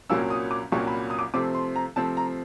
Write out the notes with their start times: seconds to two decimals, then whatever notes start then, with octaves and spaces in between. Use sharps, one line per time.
0.10 C2 A#2 F#3 A#3 C#4 E6
0.30 D#6
0.51 D6
0.72 C2 A#2 F#3 A#3 C#4 C#6
0.87 B5
1.10 D#6
1.19 D6
1.34 C3 F3 A3 C4 D6
1.55 C6
1.76 A#5
1.96 C3 F3 A3 C4 A5
2.17 A#5